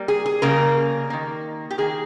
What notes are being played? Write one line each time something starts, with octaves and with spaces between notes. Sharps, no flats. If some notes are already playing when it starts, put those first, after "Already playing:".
Already playing: G3 A#3
G#4
G#4
C#3 G3 A#3 A#4
D#3 A#3
G4
D#3 A#3 G#4